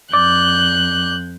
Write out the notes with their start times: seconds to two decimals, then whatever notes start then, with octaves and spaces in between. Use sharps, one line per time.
0.13 F2 D5 F#6 G6